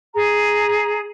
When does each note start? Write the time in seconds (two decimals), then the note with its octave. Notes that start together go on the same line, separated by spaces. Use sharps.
0.13 G#4 A#5